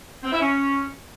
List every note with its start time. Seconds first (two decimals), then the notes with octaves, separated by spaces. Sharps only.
0.23 C4
0.32 E4
0.40 C#4